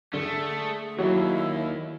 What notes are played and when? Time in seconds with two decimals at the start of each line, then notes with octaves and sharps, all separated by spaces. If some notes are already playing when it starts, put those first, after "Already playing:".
0.14 D3 A3 G#4
0.98 D#2 F#3 E4